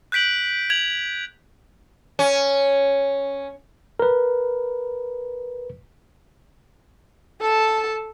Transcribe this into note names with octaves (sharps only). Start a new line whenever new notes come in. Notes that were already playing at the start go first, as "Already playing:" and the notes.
F#6 G6 B6 D7 F#7
G#6 F7 F#7
C#4
A#4 B4
A4 A5